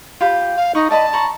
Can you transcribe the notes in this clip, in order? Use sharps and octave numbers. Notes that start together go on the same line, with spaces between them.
F4 G4 B5
F5
D#4 B5 C#6 D#6
D5 D#5 A5 B5
A#5 B5 C#6